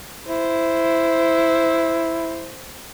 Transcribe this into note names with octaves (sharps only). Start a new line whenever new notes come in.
E4 C5